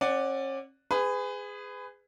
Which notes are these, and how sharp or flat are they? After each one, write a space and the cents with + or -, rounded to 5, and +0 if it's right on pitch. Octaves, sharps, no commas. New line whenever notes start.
C#4 -40 D5 +0 F#5 +0
G#4 -10 B4 +30